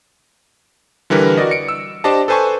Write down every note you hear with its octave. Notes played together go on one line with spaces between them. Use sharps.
D3 E3 G3 A#4 B4
F#4 A#4 D5 D#5
C#7 D7
E6
D4 G4 C5 D5 D#5 A5
A4 B4 C5 G#5 A5 C#6